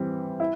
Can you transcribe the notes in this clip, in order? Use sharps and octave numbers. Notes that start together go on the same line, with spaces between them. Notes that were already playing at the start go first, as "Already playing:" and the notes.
Already playing: E3 G3 C4
E4